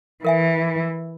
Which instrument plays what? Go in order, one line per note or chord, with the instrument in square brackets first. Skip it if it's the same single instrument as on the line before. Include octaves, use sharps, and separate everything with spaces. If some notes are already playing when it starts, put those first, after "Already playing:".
[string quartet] E3 [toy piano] A#4 E5 G#5